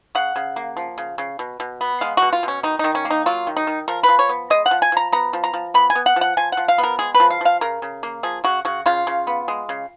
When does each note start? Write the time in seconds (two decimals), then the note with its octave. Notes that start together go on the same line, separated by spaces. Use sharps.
0.15 C#3 F#5
0.36 C#3
0.56 A#3
0.77 F3
0.98 C#3
1.18 C#3
1.39 B2
1.60 B2
1.81 B3
2.01 G#3 F5
2.17 B2 F#4
2.33 F4
2.43 B2 C#4
2.63 D#3 D#4
2.79 D#3 D#4
2.95 C#4
3.05 A#3
3.11 D#4
3.26 F#3 F4
3.47 D#3
3.57 D#4
3.67 D#3
3.88 F3 A#4
4.03 B4
4.08 F3
4.19 C#5
4.29 B3
4.50 G#3 D#5
4.66 F#5
4.71 F3
4.82 G#5
4.92 F3 A#5
5.12 B3 A#5
5.33 F3
5.44 A#5
5.54 F3
5.74 B3 B5
5.90 G#5
5.95 B3
6.06 F#5
6.16 F3
6.21 F#5
6.37 F3 G#5
6.52 F3 F#5
6.68 F5
6.78 B3
6.83 A#4
6.99 G#3 G#4
7.15 B4
7.20 F3
7.30 F5
7.41 F3 F5
7.61 C#3 A#4
7.82 C#3
8.03 A#3
8.23 F3 G#4
8.44 C#3 F#4
8.65 C#3 F#4
8.86 C#3 F4
9.07 C#3
9.27 B3
9.48 G#3
9.69 C#3